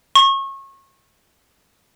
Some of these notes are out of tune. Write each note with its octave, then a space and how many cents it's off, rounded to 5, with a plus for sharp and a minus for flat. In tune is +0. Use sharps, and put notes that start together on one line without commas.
C#6 -30